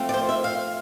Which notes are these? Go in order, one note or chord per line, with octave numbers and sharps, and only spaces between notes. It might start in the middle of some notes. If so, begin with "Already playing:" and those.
Already playing: F3 A3 C4 F4
D5
C5
E5
F5